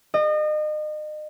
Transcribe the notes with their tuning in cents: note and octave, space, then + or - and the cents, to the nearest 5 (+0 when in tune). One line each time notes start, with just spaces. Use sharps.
D#5 -35